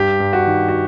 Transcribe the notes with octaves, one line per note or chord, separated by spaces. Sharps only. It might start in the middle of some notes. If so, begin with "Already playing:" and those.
Already playing: G2 G4
G2
F#4
D#3
F#4